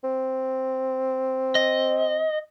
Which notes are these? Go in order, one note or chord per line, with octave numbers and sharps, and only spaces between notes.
C4
D#5